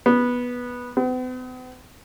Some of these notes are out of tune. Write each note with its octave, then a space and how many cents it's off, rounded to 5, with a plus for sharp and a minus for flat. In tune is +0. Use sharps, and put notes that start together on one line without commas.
B3 -10
B3 +45